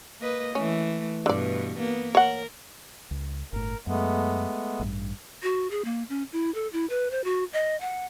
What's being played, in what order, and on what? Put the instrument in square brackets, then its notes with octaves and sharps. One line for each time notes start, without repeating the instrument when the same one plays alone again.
[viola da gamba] A#3 B4 D#5
[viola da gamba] E3 A3 [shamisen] C#4
[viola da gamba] G2 B2 [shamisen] D3 D5
[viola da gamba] A#3 B3
[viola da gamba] A#4 [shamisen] C#5 F#5
[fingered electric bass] C#2
[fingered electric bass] G1 A2 [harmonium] A#4
[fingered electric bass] F#2 [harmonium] G#3 A3 B3
[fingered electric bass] A1 G2
[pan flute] F#4
G#4
A#3
C#4
E4
A4
E4
B4
C5
F#4
D#5
F#5